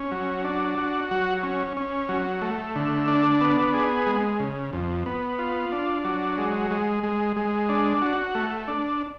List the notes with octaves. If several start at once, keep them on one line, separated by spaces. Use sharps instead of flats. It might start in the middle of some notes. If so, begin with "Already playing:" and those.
Already playing: C#4
F#3
D4
F#4
F#3
C#4
C#4
F#3
A3
D3
D4
B3
G#4
G#3
C#3
F2
B3
F4
D4
F#3
G#3
G#3
G#3
G#3
D4
F#4
A3
D4